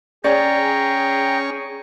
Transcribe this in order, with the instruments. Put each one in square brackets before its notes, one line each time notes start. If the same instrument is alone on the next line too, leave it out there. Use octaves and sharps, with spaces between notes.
[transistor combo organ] C#4 C#6 [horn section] G#4 [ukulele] C#5 D5 [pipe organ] G5 A#5